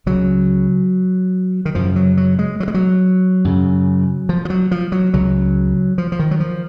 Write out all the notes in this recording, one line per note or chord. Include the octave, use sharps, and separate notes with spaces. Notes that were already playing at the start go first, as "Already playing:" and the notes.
C#2 C#3 F#3
D#3
F#2 C#3 F3
F#3
F#3
G#3
F#3
G#3
F#3
F#2 C#3
F3
F3
F#3
F3
F#3
C#2 C#3 F#3
F3
F3
D#3
F#3
F3